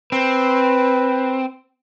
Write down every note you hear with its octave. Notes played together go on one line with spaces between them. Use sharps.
C4 B4